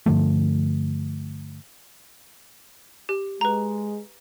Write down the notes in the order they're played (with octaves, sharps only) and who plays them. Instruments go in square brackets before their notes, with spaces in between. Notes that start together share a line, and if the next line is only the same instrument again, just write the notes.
[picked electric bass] G2 D3 F3 A3
[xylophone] G4
[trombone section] G#3 [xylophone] B4 A#5